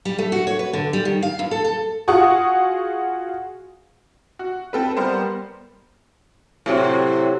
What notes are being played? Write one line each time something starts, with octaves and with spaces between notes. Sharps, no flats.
G3
A3
F#4
C#5
B4
D3
G3
D#3
F5
E2
A4
A4
F4 F#4 G#4 F#5 C#6 D#6
F#4
C4 A4 B4
G3 B3 A#4 C5
A2 C3 F#3